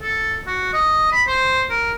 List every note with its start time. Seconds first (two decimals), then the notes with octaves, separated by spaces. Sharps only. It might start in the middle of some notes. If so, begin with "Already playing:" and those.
0.02 A4
0.47 F#4
0.73 D#5
1.12 B5
1.27 C5
1.70 A#4